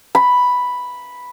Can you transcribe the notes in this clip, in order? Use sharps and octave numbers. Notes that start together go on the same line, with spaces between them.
B5